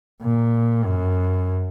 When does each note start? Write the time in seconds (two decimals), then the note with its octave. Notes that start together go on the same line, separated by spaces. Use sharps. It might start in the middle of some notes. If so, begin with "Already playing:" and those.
0.22 A#2
0.85 F#2